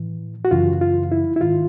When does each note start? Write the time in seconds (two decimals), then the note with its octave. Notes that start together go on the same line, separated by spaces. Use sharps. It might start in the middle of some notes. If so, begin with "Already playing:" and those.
Already playing: A2 E3
0.45 F#4
0.51 F#2 C#3 E3 F4
0.81 F4
1.12 E4
1.36 E4
1.41 G#2 D#3 F4